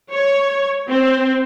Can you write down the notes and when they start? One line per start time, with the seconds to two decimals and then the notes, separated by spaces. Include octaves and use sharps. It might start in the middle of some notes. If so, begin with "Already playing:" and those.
0.11 C#5
0.88 C4